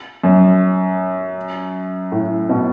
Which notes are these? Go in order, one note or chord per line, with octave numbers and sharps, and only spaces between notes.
F#2
A2
B2